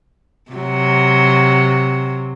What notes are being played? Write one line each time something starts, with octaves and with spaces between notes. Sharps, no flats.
C3 F#3